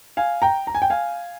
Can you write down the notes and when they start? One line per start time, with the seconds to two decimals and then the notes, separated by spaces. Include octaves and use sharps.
0.17 F5 G#5
0.42 G5 A#5
0.67 A#5
0.75 G#5
0.82 G5
0.90 F5 G#5